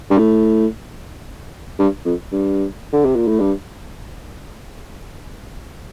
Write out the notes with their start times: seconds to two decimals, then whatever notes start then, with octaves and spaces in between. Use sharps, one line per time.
0.10 G2
0.18 A2
1.79 G2
2.05 F2
2.32 G2
2.93 D3
3.05 C3
3.16 A#2
3.28 A2
3.40 G2